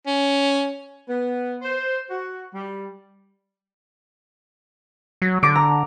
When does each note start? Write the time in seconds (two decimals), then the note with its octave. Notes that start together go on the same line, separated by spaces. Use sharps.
0.07 C#4
1.08 B3
1.62 C5
2.09 F#4
2.53 G3
5.22 F#3
5.43 D3 D6 D7
5.55 A#5